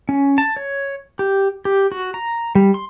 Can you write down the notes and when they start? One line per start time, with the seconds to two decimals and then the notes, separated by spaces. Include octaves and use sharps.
0.09 C#4
0.38 A5
0.57 C#5
1.19 G4
1.65 G4
1.92 F#4
2.14 A#5
2.55 G3
2.74 C6